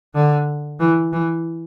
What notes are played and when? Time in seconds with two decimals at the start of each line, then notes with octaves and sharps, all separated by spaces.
0.15 D3
0.80 E3
1.13 E3